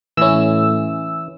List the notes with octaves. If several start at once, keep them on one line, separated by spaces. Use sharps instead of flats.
A2 E3 C#4 E4 E6